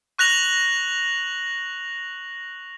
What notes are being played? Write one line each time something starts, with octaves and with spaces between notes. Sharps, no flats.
C#6 F#6 A#6 F7 F#7